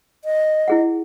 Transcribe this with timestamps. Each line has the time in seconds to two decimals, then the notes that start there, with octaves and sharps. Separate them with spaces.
0.25 D#5
0.68 E4 G#4 F#5